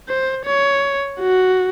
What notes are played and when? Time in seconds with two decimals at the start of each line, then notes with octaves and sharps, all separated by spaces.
0.09 C5
0.45 C#5
1.19 F#4